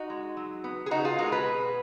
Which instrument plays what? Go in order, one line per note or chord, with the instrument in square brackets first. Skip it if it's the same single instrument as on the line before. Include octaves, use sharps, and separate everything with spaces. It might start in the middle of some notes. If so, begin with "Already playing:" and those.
Already playing: [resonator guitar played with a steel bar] D#4 F#4
G#3
F#3
B3
G#4
C#3 D#4 F#4
F4 G#4
G#3 F#4 A#4
G#4 B4
B2